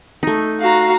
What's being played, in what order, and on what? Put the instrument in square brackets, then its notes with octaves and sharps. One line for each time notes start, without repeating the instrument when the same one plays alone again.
[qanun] A3 D#4
[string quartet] F#4 F5 A#5